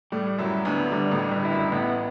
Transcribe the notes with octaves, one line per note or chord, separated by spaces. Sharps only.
A2 G3 A3
F#2 F#3 E4
D2 D3 B3
D2 D3 G3
A1 A2
G3
G1 G2
E4
F#2
A1 A2 B3